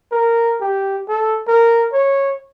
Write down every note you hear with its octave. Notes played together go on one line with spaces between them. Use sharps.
A#4
G4
A4
A#4
C#5